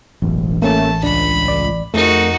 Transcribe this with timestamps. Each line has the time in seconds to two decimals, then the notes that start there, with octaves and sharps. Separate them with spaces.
0.22 E1 A1 F#2
0.62 A3 A#3 C#4 A5
1.03 C#2 D4 B5
1.48 D5
1.94 F2 A3 D#4 F#4 G#4 A#4